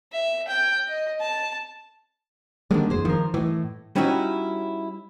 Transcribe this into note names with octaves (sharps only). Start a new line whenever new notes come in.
E5
G5
D#5
A5
D3 D#3 G3 G#3 A#3 D4
F#1 E2 G#4 C5
D#3 F3 A#4
A2 E3 D#5
G3 C#4 D#4 E4 F#4